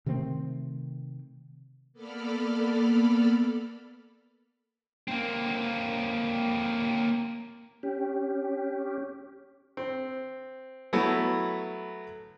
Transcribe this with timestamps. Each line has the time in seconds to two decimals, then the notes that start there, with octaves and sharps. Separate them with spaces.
0.06 C3 D#3 A3 C4
1.93 A#3 B3 A4 D5 B5 F6
5.08 A#3 C4
7.83 C#4 G4
9.77 C4
10.93 F#3 A3 B3 E4